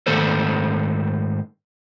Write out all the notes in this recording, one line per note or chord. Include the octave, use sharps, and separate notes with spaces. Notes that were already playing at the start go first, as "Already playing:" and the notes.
G#2 D#3 A3 A4 C5